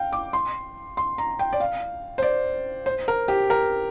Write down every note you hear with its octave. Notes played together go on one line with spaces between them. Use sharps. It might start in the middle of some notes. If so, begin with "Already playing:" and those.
Already playing: F5 G5
D6
C6
C6
A#5
G5
D5
F5
C5
D5
C5
A#4
G4
A#4